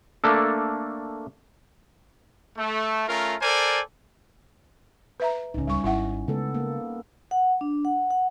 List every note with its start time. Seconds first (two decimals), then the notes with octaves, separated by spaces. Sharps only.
0.24 A3 A#3 D4 A4
2.57 A3
3.07 A3 C#4 F4 A#4
3.41 A4 A#4 C5 D5 G#5
5.20 B4 E5 A#5
5.54 D1 C#2 C#4 D#4
5.67 G3 C#6
5.84 G#1 E4 E5 F#5
6.28 C#3 G#3 A3 B3 A4
6.55 A#3
7.31 F#5
7.61 D4
7.85 F#5
8.11 F#5